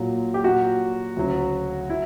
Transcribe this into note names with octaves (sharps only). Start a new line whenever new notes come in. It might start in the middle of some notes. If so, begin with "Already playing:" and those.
Already playing: A#2 F#3
G4
A#2 F#3 F#4
D2 C#3 F#3
F#3 E4